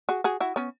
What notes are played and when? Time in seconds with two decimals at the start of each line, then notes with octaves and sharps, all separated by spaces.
0.09 F#4 G#4
0.24 F#4 G#4
0.40 E4 F#4
0.56 B3 C#4